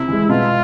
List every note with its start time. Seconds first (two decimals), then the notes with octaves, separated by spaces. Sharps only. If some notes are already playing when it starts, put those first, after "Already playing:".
Already playing: C3 E4
0.08 E3 G#3
0.29 B2 F4